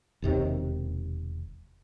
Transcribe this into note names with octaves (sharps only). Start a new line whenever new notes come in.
E1 D#2 C3 D#3